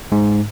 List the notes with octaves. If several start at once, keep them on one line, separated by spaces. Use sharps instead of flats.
G#2